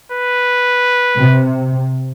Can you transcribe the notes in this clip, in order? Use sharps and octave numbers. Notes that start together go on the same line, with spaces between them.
B4
C3